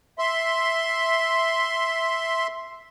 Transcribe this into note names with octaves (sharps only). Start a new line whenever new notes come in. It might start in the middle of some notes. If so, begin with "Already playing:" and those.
E5 C6